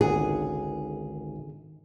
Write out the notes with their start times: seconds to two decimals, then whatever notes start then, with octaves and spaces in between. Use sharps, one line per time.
0.01 G#1 C#2 D3 D#3 G#4 F#5